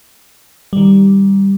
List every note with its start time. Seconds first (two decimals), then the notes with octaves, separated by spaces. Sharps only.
0.73 D#3 G3